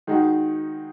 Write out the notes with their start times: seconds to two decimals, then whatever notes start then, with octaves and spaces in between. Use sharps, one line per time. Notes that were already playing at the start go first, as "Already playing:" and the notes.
0.07 D#3 G#3 D#4 F#4